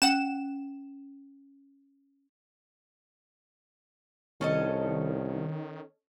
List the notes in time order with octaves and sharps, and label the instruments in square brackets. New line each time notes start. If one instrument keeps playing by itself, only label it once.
[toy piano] C#4 [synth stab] F#5 E7
[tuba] C2 [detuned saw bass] D#3 [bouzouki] C#4 A4 D#5